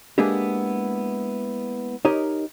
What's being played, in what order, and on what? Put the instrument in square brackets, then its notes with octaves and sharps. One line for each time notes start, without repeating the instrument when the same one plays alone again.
[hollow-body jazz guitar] G#3 A#3 B3 D4 E4 G4
D#4 G4 A#4 C#5 D#5